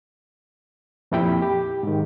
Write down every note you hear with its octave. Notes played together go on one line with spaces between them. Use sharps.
F2 A#2 E4 G4 G5 B5
G4
G#2 D#3